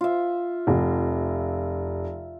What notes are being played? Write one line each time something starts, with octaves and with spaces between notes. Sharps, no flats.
F4 E5
F1